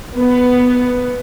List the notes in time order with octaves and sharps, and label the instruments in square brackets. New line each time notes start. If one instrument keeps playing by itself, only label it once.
[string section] B3